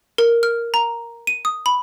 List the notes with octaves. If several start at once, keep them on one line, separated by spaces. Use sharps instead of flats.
A#4
F6
A#5
D#7
D#6
B5